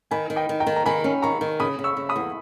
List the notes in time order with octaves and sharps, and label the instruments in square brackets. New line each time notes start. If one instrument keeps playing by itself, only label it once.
[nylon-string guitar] D#3 [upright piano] G#5 B5
[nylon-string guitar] D#3
[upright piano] D#5 G5
[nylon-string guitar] D#3
[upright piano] G5 A#5
[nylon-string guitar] D#3
[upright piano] A#5
[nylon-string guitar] D#3 [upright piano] G#5 B5
[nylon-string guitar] C#4
[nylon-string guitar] D#3 [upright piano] A#5 C#6
[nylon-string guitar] D#3
[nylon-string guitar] C#3 [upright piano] B5 D#6
[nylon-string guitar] C#3
[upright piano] C#6 E6
[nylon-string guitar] C#3
[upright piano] B5 D#6
[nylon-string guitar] E2